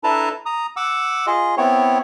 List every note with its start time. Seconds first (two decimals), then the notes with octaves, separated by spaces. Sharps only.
0.04 D4 E4 A4 B4 A5 A#5
0.46 A#5 D#6
0.77 F#5 D6 E6
1.27 F4 G#4 D#5
1.57 B3 C4 E4 C#5